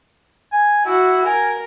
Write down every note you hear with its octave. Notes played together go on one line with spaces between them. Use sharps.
G#5
E4 F#4
A#4 G#5